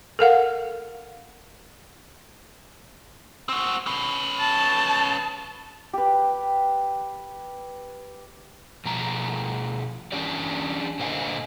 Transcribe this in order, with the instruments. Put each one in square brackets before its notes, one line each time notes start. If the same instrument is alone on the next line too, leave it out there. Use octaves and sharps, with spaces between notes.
[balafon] A4 A#4 F5 F#5
[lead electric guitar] C4 F#4
C#4 B4
[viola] A5
[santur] G4 B4
[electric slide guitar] B2 F3 A#5
E3 G#3 C#4 D4 G4 D5
A#2 D3 C5 D#5 F5 G#5